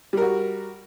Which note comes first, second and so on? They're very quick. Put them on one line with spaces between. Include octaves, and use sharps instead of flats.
G3 A#4 F#4